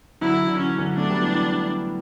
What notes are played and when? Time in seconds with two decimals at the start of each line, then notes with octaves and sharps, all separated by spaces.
0.21 D3 F#3 E4
0.33 E3
0.47 D3
0.59 E3 C#4
0.78 D3 F#3
0.96 F#3 A3 D4
1.10 G3 B3
1.22 E3
1.35 E3